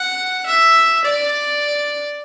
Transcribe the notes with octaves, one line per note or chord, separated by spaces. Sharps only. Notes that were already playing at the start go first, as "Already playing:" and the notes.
Already playing: F#5
E5
D5